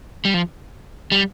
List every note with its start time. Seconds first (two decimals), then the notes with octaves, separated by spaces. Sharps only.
0.25 G3
0.34 F3
1.12 G3